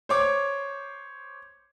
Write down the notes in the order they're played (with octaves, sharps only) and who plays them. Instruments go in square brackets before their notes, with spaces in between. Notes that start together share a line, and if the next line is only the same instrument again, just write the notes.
[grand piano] C5 C#5 D6